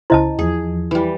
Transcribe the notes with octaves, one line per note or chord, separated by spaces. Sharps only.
C#2 C#3 E4 C5 D#5 A5
E2 F3 G#4
E3 G3